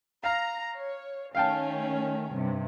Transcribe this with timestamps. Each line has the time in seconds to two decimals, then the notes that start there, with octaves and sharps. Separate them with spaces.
0.24 F5 A#5
0.75 C#5
1.35 D#3 A3 C#4 F5 G5 A5
2.32 G2 C3